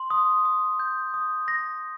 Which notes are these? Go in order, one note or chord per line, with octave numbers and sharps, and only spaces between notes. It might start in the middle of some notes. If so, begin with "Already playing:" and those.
Already playing: C6
D#6
D#6
G6
D#6
A#6